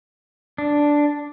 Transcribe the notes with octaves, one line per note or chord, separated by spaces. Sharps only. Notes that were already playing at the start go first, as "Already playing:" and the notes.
D4